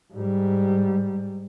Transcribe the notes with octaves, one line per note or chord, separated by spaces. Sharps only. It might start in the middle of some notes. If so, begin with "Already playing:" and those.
G#2 G3